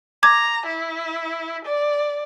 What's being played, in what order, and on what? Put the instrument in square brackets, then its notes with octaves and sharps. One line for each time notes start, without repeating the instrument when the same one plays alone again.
[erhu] A#5 [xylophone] D6 G#6
[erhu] E4
D5